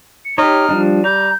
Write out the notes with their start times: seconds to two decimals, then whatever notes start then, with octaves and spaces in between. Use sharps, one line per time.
0.24 C#7
0.38 D#4 G4 C#5 F6
0.69 F3 G3 D4
1.04 G3 A#5 G6